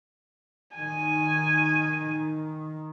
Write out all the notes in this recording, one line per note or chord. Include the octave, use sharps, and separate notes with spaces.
D#3 G#5